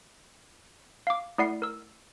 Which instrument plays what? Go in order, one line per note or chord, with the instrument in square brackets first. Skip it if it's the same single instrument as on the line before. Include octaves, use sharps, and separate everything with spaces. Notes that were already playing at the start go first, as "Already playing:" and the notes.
[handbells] F5 D6
A3 E4 D5 F#5 C7
A#4 E6